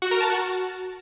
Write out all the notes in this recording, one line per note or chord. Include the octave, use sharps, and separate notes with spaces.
F#4
A#4
A5
F#4